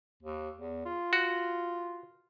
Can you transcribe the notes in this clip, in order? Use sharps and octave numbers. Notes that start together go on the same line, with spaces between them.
D#2
E2
F4
F#4